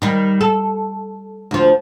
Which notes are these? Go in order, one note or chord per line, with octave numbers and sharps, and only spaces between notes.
D#3 G3
A4
D2 F3